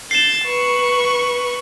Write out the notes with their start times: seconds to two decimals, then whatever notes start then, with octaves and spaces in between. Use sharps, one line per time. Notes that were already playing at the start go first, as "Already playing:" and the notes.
0.11 G6 A6 C7 E7
0.46 B4 C#6